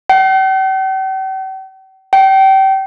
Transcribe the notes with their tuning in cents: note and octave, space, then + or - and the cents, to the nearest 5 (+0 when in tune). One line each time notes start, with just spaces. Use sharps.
G5 -45
G5 -30